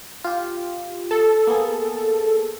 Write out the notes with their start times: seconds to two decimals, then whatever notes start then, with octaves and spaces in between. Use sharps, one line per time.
0.24 F4 G4
1.11 A4
1.47 A#3 B3 G#4